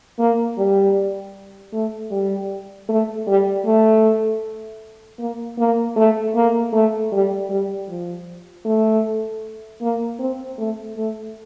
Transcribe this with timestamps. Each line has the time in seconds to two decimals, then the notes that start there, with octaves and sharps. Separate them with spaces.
0.19 A#3
0.58 G3
1.73 A3
2.11 G3
2.89 A3
3.27 G3
3.66 A3
5.19 A#3
5.58 A#3
5.96 A3
6.35 A#3
6.73 A3
7.12 G3
7.50 G3
7.88 F3
8.65 A3
9.81 A#3
10.19 C4
10.58 A3
10.96 A3